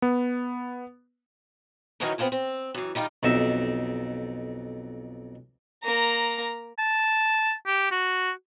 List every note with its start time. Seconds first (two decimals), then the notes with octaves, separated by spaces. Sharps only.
0.02 B3
2.00 D#3 E3 F#3 C#4 D#4
2.18 B3 C4 D4 F4 G#4
2.32 C4
2.74 F#2 E3
2.95 D#3 G3 D#4 F4
3.23 B1 F2 D#4 E5
5.83 A#3 A#5
6.78 A5
7.67 G4
7.91 F#4